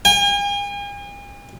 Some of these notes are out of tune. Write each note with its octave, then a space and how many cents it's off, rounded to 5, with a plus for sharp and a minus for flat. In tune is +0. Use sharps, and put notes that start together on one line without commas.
G#5 -45